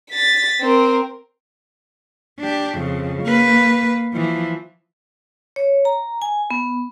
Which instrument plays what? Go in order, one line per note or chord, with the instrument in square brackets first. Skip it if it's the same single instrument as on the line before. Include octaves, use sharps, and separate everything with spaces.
[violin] A6 B6
C4 A#4
[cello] D4 G4
F2 C#3
A#3 B4
E3 F3
[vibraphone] C#5
A#5
G#5
B3